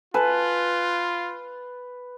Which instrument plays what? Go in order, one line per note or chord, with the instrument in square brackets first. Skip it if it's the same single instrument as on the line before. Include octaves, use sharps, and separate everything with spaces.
[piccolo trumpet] F4 [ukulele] A4 G#5 A5 [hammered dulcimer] B4